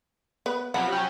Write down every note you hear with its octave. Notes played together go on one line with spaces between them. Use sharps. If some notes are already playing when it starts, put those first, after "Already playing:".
B3 B4
C3 F3 F#3 F#5 B5
F#3 C#4 G5